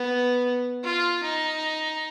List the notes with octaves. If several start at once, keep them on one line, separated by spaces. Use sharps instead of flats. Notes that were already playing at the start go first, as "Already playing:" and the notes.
Already playing: B3
F4
D#4